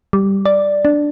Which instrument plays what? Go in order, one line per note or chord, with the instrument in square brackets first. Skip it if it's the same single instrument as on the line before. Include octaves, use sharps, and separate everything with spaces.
[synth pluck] G3
D5
D4